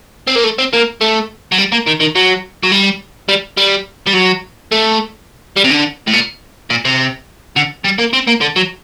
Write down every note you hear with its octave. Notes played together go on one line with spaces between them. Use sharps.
C4
A#3
A3
C4
A#3
A3
F#3
G3
A#3
D#3
D#3
F#3
F#3
G3
G3
G3
G3
F#3
A3
G3
C3
D3
A2
A#2
A#2
C3
D3
G3
A#3
C4
A#3
D3
F#3